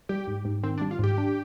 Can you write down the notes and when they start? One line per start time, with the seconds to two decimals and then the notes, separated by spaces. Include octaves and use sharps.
0.09 G3 G4
0.27 G#2
0.45 G#2
0.63 D#3 C4
0.78 D4
0.82 G3
0.91 F4
0.99 G#2 G4
1.18 D4